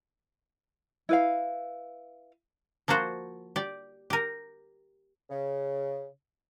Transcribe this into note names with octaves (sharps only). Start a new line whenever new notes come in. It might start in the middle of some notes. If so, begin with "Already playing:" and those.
E4 B4 F5
F3 A#3 F4 F#4 C5
G4 D5
G4 A#4
C#3